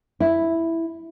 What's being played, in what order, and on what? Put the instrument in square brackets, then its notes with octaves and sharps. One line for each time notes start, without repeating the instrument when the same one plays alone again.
[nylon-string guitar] E4